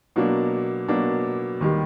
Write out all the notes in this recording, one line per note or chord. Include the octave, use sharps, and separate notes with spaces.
B2 F#3 A#3 D4
B2 F#3 A#3 D4
D#2 D#3 G3